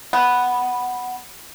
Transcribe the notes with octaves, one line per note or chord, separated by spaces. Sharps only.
B3